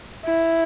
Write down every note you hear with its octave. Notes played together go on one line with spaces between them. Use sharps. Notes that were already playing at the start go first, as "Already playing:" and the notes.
E4